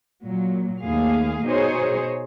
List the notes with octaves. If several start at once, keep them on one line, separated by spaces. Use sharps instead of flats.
A#2 F#3
D#2 A3 G#4 F5
B2 D#4 G#4 C5 C#5